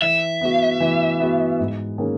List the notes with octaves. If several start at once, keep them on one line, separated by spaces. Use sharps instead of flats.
E3 E5
B3 F#4
E3
B3 F#4
G#2
D#3 A#3 C#4 G#4